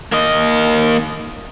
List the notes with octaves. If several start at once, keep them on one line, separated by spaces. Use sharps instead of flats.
A#3 D#5